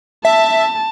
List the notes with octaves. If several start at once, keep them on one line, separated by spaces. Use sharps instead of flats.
E5 A5